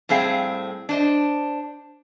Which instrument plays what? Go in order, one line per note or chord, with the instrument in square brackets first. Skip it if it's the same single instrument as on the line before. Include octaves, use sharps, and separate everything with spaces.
[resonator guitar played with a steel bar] A2 G3 C4 G#4 F5 G5
D4 C5 D#5